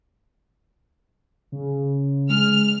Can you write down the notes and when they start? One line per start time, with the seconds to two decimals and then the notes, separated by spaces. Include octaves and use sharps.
1.52 C#3
2.30 G#3 F6